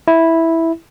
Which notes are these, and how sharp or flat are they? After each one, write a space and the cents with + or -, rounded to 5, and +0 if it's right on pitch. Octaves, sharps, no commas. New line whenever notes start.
E4 -5